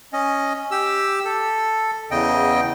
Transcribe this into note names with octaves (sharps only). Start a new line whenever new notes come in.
C#4 D#5
G4 E6
A4
E2 C#3 D#5 G5